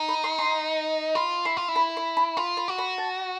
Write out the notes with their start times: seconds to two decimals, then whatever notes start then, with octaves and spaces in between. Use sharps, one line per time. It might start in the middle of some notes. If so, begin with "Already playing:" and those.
Already playing: D#4
0.09 B5
0.24 C6
0.39 C6
1.15 F4 B5
1.45 E4 C6
1.57 F4
1.68 E4
1.76 B5
1.97 B5
2.17 B5
2.37 F4 B5
2.57 B5
2.68 F#4
2.78 B5
2.98 A5